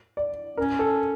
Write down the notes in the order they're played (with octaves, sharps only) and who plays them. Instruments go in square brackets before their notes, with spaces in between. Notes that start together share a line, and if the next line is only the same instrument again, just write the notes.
[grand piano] D5
[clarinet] C#4 [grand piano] A#4
[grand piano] A4